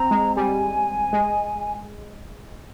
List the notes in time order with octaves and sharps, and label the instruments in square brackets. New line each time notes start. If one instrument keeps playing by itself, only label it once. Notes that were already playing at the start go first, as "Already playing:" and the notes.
Already playing: [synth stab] C4 [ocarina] A#5
[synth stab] G#3
[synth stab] G3 [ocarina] G#5
[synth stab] G#3